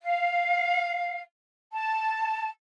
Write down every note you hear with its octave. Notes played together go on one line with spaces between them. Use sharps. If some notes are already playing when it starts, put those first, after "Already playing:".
F5
A5